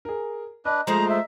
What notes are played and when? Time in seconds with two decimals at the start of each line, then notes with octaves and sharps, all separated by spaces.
0.05 G#4 A#4
0.65 D4 B4 D#5
0.87 F3 G#3 A3 C5 A#5
1.09 D#5 E5 A#5